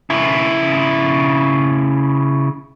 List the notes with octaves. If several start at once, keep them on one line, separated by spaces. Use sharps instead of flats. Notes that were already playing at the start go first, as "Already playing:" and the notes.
C#3 E4